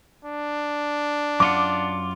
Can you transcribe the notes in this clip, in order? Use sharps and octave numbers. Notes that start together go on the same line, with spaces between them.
D4
F#2 F4 F#5 D6